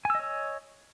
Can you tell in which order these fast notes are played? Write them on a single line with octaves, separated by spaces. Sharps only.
G#5 E6 D#5 C#5